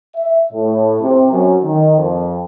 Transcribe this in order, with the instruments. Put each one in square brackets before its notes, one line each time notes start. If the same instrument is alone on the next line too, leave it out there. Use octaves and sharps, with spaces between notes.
[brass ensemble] E5
A2
C3
F#2
D#3
F2